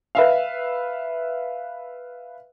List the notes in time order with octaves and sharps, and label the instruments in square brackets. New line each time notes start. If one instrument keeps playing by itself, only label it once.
[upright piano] B4 E5 F5